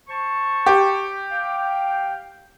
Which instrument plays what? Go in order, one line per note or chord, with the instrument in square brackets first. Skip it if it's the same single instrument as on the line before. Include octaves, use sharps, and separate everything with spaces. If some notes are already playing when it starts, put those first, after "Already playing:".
[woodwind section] C5 A5 C#6
[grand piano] G4
[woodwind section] F5 G5